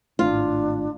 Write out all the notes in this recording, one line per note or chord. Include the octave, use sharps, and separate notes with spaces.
G#1 A2 D4 F4